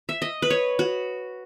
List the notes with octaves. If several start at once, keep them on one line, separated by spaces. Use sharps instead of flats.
E5
D#5
B4
C#5
F#4